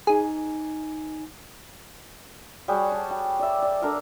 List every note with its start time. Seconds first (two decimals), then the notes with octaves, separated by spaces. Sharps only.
0.07 D#4 G#4 G#5
2.68 G3 F#4 G#4 C#5
2.92 A5
3.11 G5
3.39 D5 E5
3.62 D5
3.82 D4 A4 A#4 D5